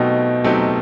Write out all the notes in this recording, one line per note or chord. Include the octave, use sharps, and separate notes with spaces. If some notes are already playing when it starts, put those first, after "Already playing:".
Already playing: B2 F#3 A3 C4 D#4 G4
F#3 A3 C4 D#4 G4